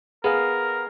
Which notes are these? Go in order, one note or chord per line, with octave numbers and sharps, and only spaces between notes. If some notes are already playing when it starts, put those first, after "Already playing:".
B3 G#4 A#4 F5